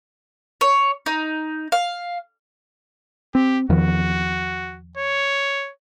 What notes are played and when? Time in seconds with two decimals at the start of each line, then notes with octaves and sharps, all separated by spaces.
0.61 C#5
1.06 D#4
1.72 F5
3.35 C4 G4
3.69 E2 D#3 F3 F#4
4.97 C#5